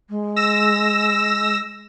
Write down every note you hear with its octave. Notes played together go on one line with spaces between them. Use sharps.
G#3
E6 A#6 E7